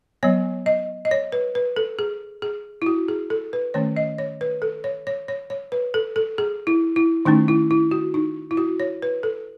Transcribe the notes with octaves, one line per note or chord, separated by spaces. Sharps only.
F#3 B3 C#5
D#5
D#5
C#5
B4
B4
A4
G#4
G#4
E4
F#4
G#4
A4
B4
D#3 A3 C#4 C#5
D#5
C#5
B4
A4
C#5
C#5
C#5
C#5
B4
A4
A4
G#4
E4
E4
D#3 A3 C#4 D#4
E4
E4
F#4
D#4
E4
F#4
C#5
B4
A4